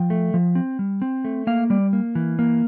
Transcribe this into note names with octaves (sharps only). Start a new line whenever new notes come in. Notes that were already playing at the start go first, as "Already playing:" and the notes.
Already playing: F3 G5
A3
F3
C4
G3
C4
A3
A#3 F5
G3 D5
A#3
E3
A#3